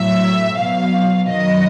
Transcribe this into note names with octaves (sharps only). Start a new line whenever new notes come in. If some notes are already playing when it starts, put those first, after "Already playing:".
Already playing: A2 F#3 E5
B2 F#3 F5
F#2 D#3 F#3 D#5